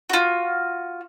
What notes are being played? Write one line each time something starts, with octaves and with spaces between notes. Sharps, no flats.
F4 F#4